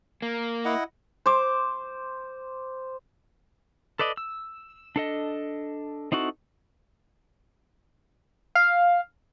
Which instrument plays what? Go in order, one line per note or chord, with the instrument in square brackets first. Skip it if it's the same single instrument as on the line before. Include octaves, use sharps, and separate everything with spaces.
[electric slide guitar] A#3
[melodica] E4 D#5 F#5
[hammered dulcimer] C5 D6
[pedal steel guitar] A4 B4 D5 D#5
E6
D4 A4 D#5
C4 D#4 E4 F#4 A4
[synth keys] F5